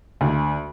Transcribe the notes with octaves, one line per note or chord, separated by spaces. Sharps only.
D2